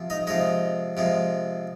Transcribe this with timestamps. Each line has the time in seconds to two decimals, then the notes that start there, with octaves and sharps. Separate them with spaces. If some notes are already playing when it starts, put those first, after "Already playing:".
Already playing: C3 F3
0.10 D#4 D#5
0.27 C3 F3 G#3 D#4 D#5
0.97 C3 F3 G#3